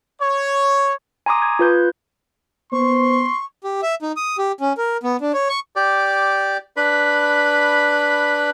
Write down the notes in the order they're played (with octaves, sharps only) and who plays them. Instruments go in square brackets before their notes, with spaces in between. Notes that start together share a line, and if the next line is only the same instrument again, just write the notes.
[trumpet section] C#5
[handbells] G#5 A#5 C6 D6 D#6
G#6
F4 B4 G6
[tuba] B3 [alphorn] C5 [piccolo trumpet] C6 [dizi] C#6
[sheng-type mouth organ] G4
E5
D#4
D#6
G4
C#4
A#4
B3
D4
C#5
C#6
[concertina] G4 D5
D4 B4 B5